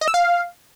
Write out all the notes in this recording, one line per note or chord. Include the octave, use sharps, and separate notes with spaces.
D#5
E6
F5